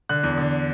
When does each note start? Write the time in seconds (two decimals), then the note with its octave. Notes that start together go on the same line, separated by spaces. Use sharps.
0.09 D3 F#6
0.23 E2
0.38 D3